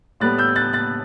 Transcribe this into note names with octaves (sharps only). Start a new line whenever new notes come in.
A2 G3 B3 F#6 A6
E6 G6
F#6 A6
F#6 A6